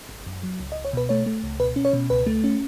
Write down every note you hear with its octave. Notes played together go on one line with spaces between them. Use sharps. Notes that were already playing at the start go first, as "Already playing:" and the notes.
G#1
F#2
F#3
C#2
D#5
C#2
C#5
B2 B4
A3 C#5
A3
C#2
B2 B4
C#4
C#5
B2
C#2 B4
A3
C#4